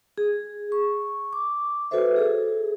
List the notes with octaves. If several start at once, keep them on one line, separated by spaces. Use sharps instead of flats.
G#4
C#6
D6
F#4 A4 B4 C5 E5
G#4 A4